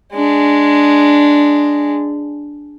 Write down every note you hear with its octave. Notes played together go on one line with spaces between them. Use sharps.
G#3 D4